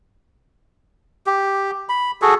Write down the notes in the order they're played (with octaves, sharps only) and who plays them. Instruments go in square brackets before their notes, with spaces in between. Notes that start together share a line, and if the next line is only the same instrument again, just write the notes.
[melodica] G4
B5
F#4 G#4 A4